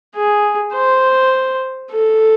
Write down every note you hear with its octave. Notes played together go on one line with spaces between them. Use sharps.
G#4
C5
A4